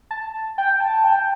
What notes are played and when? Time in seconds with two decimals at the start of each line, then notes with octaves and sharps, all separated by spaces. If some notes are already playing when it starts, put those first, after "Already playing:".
0.11 A5
0.58 G5
0.80 A5
1.04 G5